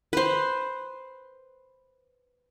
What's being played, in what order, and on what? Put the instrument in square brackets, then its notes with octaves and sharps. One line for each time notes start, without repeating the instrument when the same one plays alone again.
[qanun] B4 C5